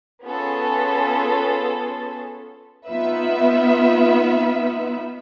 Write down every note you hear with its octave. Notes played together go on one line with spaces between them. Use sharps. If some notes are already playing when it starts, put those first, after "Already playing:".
B3 C#4 F4 G#4 A4
B3 D#4 F4 B4 E5